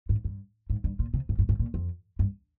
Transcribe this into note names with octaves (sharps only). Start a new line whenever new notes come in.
G#2
G2
G#2
G2
A#2
C3
G#2
G2
G#2
A#2
F2
G2